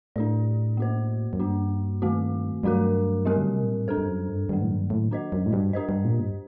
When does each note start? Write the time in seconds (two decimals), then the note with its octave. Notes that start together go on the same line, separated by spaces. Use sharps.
0.16 A2 D4 G4 D5
0.77 A#3 F#4 C5
1.33 F#2
1.40 G2 A#3 D4 F#4
2.02 D#3 A3 C4 F#4
2.63 G2 F#3 A3 D4 F#4 A#4
3.25 G3 C4 G4 A#4
3.37 D3
3.50 C3
3.63 A#2
3.75 A2
3.87 G2 D4 A4 C5
3.98 G2
4.08 F#2
4.29 G2
4.49 G2 D#3 F#3 A#3
4.62 A2
4.70 G2
4.90 A2
5.11 D4 F#4 C5 D#5
5.32 F#2
5.46 A2
5.53 G2
5.73 D4 G4 C5 D#5
5.89 G2
6.05 A#2
6.20 G2